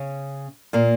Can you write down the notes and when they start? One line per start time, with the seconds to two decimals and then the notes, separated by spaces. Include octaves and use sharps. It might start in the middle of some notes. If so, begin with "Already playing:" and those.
Already playing: C#3 C#4
0.73 A#2 A#3